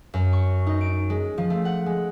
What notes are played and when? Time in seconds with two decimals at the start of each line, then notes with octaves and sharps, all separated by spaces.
0.14 F#2
0.33 C#6
0.67 D#4
0.81 D7
1.10 G#3
1.38 F3
1.50 A3
1.65 F#5
1.86 G#3